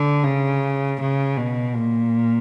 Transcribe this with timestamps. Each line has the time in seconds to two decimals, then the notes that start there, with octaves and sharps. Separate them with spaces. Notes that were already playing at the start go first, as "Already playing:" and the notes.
Already playing: D3
0.24 C#3
1.00 C#3
1.38 B2
1.75 A#2